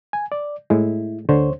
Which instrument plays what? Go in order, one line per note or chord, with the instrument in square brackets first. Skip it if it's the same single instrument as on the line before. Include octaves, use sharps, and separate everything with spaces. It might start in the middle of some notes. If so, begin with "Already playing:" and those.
[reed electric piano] G#5
D5
[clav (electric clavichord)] A2 G#3 [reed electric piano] E4
[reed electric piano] D2 C5 C#5 [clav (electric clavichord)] D3